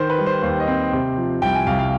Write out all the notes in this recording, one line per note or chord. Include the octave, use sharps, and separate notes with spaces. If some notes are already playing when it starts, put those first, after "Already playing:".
Already playing: D#3 C5
B4
G3
C5
D#2 C5
D#5
C4
C3
F3
C2 G5
G#5
C2 F5
F5